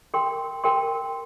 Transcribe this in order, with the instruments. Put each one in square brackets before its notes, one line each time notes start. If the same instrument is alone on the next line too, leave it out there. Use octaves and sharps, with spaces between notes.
[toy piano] A#4 G5 C6
A#4 G5 C6